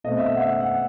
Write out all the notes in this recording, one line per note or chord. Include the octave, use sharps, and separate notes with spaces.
B2 A3 C4 D#5
E5
D#5
F#5
E5
F#5